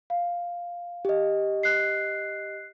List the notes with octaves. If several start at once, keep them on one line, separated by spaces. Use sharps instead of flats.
F5
G4 D#5
F#6 C7